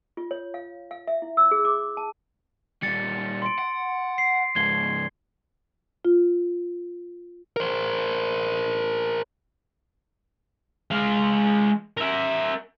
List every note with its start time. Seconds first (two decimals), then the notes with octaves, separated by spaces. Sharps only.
0.17 F4
0.31 C#5
0.54 F5
0.91 F5
1.07 E5
1.22 E4
1.37 E6
1.51 G#4
1.65 D6
1.97 A5
2.82 A#2 G3 A6 C#7
3.42 C6 D7
3.59 F#5
4.18 C7
4.56 C#2 G#2 G#6 C7 G7
6.05 F4
7.57 A#4 C5
10.91 G#3 F5
11.97 A#4 E5